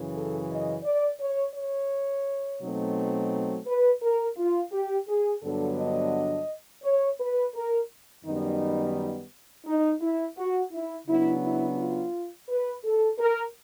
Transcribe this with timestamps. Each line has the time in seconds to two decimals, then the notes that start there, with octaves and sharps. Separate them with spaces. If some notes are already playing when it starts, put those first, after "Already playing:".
Already playing: F#2 C#3 E3
0.14 A4
0.49 D#5
0.84 D5
1.20 C#5
1.55 C#5
2.61 B2 F#3 A3 C4 D#4
3.66 B4
4.02 A#4
4.37 F4
4.72 G4
5.08 G#4
5.43 G2 D3 F#3 B3 D4 A4
5.78 D#5
6.83 C#5
7.20 B4
7.55 A#4
8.24 F#2 D#3 G3 B3 D#4
9.66 D#4
10.01 E4
10.37 F#4
10.72 E4
11.07 C#3 F#3 B3 D4 E4
11.42 E4
11.77 F4
12.49 B4
12.84 A4
13.19 A#4